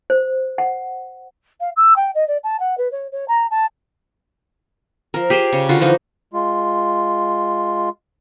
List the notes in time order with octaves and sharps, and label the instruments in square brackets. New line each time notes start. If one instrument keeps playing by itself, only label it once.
[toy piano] C5
F#5
[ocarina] F5
E6
G5
D#5
D5
A5
F#5
B4
C#5
C#5
A#5
A5
[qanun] F3 A#4
G4 G#4 A#4 C5
C#3
D3 F4 F#4
E3 F3 D#4
[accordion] G#3 F4